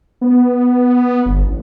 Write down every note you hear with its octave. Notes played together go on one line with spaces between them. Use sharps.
B3
G1
A1